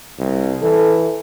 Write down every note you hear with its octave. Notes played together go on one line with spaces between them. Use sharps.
C2
E3 A4